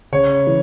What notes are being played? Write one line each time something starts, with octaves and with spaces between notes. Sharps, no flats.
C#3 C#5
E3